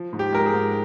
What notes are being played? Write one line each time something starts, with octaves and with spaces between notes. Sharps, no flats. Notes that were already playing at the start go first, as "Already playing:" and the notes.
Already playing: F3
G#2
G4
G#3 A#4
G#4
G#2